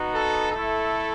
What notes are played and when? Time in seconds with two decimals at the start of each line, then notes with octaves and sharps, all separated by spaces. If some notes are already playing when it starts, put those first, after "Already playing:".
Already playing: B3 D#4 F#4
0.14 A4
0.52 A3 E4 A4